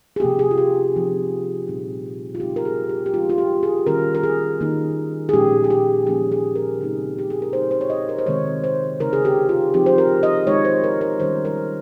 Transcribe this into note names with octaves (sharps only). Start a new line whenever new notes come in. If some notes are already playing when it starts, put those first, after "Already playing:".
G#4
C3 F3 A#3 C#4 G4
G#4
F4
G4
F3 C4 D#4
A#2 G3 C4 D#4
F4
C#3 G3 C4 D#4 G4
A#4
G#4
G4
G4
F3 G#3 C#4 F4
F4
G4
G#4
D#3 G3 C#4 A#4
A#4
G#4
D#3 A#3 D#4
G#4
A#2 F3 G#3 C#4 G4
G#4
G4
F3 A#3 C#4 G#4
G#4
A#4
C#3 G#3 C4 D#4
G4
G#4
A#4
C#3 G#3 C4 D#4 C5
C5
C#5
D#5
A#4
C5
C3 D#3 G#3 C4 C#5
C5
C#3 G#3 C4 D#4 A#4
G#4
G4
F4
F3 C4 D#4 G4
C5
A#4
D#5
D#3 G#3 D#4 C#5
C5
A#4
A#4
D#3 G3 C#4 C5
A#4